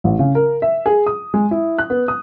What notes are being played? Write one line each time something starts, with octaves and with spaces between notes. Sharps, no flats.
A1
C#3
A#4
E5
G#4
D#6
G#3
E4
F#6
B3
D#6